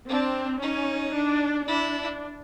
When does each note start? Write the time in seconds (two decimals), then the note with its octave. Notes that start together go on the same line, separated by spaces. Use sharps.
0.08 C4 D4
0.61 C#4 D#4
1.15 D4
1.68 D4 E4